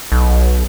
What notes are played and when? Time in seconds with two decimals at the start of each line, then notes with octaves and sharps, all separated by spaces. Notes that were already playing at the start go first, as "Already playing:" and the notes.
0.12 B1